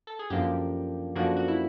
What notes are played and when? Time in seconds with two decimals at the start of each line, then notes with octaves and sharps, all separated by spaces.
0.07 A4
0.19 G#4
0.30 F#2 D3 F3 A#3 D4 G4
1.15 F#2 D3 F3 A#3 D4 F#4
1.36 F#4
1.48 E4